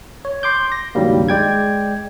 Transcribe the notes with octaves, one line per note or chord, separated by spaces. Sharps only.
C#5
C6 D6 G6
A#6
C#2 G2 D#3 F#3 G3 A#3
G#3 D5 G5 G#6